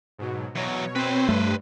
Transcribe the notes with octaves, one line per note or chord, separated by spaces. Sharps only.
G#2 B2 F#3
E2 B2 F#3 C#5
C4 B4 C5
G2 A3